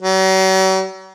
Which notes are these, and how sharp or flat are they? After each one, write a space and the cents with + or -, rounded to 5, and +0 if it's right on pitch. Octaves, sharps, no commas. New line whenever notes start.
F#3 +45